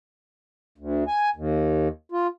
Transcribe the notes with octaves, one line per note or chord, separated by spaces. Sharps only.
D2
G#5
D#2
F4